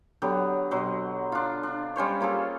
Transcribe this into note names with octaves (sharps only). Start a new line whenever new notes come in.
D3 F#3 B3 G4
B2 F#3 C5
D4 F4
D4
G3 C#4 C5 C#5
A#3 F4 G#4 A4